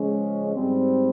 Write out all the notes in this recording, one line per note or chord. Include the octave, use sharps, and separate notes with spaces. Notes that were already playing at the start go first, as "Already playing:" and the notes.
Already playing: C#3 F3 G#3 C#4
G#2 G3 C4